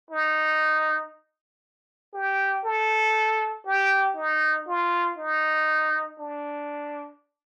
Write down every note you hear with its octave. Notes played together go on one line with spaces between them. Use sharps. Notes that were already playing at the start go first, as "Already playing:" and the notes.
D#4
G4
A4
G4
D#4
F4
D#4
D4